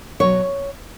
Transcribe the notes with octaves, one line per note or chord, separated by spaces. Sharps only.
B2 F#3 C#5